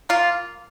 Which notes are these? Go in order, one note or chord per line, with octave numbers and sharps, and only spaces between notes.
A#3 F4